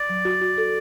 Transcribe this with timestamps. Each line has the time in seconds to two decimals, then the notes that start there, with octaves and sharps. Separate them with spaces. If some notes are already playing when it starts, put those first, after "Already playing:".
Already playing: D5
0.09 F#3
0.25 F#4
0.41 F#4
0.58 A4